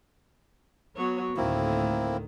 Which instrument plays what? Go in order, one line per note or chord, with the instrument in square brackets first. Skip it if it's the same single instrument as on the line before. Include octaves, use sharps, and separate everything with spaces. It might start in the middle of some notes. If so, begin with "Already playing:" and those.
[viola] F#3 C#5 [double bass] B3
[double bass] D2 A2 [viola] D#3 [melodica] A#3 C4 E4